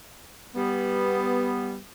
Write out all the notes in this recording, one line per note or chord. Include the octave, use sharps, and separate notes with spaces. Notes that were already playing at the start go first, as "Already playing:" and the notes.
G3 B3